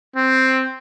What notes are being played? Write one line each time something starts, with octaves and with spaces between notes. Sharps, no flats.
C4